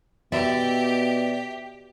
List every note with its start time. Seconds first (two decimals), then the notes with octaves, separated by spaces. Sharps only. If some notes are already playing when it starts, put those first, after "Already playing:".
0.32 B2 G4 D5 E5